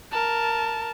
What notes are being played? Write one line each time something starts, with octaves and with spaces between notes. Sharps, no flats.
A#4 A5